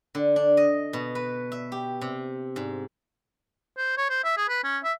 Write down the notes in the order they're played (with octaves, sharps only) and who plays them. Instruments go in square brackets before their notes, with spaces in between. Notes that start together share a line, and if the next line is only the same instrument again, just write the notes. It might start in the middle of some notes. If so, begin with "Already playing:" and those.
[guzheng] D3
D4
D#5
B2
B4
E5
G4
C3
G#2
[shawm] C5
C#5
C5
E5
G#4
B4
C#4
E5